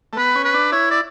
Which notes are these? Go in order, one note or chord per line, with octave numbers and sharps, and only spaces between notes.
A3
B3 B4
C#4
B4
D4
E4 C#5
D5